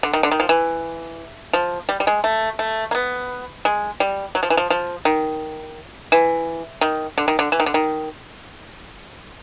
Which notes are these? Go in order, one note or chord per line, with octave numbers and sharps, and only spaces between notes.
D3
D#3
D3
D#3
F3
E3
F3
G3
G3
G#3
A3
A3
A#3
B3
G#3
G3
F#3
F3
E3
F3
F3
D#3
E3
D#3
D3
D#3
D3
E3
D#3
D3
D#3